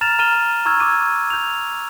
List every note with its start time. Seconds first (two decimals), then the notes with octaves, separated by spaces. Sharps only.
0.01 A#5 F6 A6 E7 F7
0.19 A#5 F6 A6 D#7 E7 G7
0.65 A#5 C#6 E6 F6 G#6
0.80 D6 G#6 D#7
1.30 G6 F7